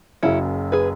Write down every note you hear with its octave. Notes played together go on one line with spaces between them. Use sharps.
F#1 F#2 C#3 C#4 E4
G#4 B4